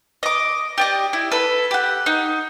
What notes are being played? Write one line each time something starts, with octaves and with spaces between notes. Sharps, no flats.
D#5 D6
G4 D5 D#5
E4
A4 B4
G4 F#5
D#4